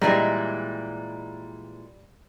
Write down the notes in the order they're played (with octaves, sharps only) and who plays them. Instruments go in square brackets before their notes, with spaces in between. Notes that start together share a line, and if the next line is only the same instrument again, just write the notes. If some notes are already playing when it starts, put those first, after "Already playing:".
[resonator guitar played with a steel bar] A#2 E3 G#3 [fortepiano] G3